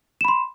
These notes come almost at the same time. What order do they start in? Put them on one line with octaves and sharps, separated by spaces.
E7 B5 C6